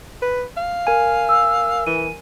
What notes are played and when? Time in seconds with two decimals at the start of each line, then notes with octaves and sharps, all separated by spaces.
0.22 B4
0.57 F5
0.87 A#4 G#5
1.29 E6
1.87 E3 D#7